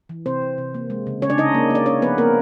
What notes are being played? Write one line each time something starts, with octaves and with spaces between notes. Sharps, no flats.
E3
C3 C4 C5
C3
C3
A#3
G#3
C#3
C#3 C#4 C#5
D4 D5
C#3 D#4 D#5
A#3
A#3 D5
C#4 C#5
F3 B3 B4
A#3 C4 A#4